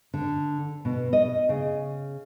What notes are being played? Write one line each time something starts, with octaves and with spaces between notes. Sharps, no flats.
D3
B2
D#5
C#3